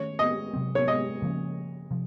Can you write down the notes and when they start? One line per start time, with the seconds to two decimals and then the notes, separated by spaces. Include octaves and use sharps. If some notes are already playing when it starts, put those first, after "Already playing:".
Already playing: D#3 A3 C#4 C#5
0.19 D#5
0.54 C3 F#3 C4
0.75 C#5
0.88 D#5
1.22 C#3 F3 A#3 C#4
1.91 C3 F3